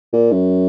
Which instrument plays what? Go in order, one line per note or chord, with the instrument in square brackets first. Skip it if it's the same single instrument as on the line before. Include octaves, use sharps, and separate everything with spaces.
[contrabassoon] A#2
F#2